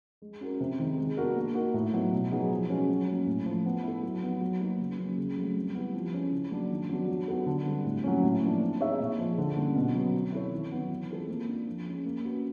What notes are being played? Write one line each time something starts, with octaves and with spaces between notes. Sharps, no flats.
G#3
C#4 F#4 A#4
C3
D#3 G#3
G#3
B3 D4 F#4 A#4
A#3
D#4 F#4 A#4
A2
F#3 B3 D#4
B2
F#3 B3 D#4 G#4
F3
G#3 C#4 F#4
F#3
A#3 C#4
A2
F3 A3
B3
E4 A4
F#3
B3 D#4
F#3
A#3 D#4 F#4 B4
C#3
F#3 A#3 C#4
C#3
F#3 A3 C4
G3
B3 E4 G4 B4
F3
G#3 C#4 E4
C#3
F#3 A#3 D4
D#3
F#3 B3 D4 F#4
F#3
B3 D#4 F#4 A4
D3
G3 C4
A2
F#3 A#3 C#4
A2
F3 A#3 D4
C4
D#4 G#4 C#5 E5
A#2
F3 G#3
D3
G3 A#3 C#4 E4
B2
F#3 B3
C4
E4 A4 C#5
D#3
F#3 B3 D#4
E3
G#3 C4 F4 A4
A#3
D4 F4
F3
G#3 C#4
A#3
C#4 F#4 B4